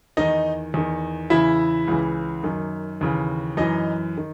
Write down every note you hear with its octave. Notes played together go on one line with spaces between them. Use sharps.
E2 D#3 D#4 D#5
E2 D#3
E2 C#3 E3 E4 E5
C#2 C#3 E3
F#2 D#3
D#2 C#3 E3
F#2 E3 D#4 D#5
D#3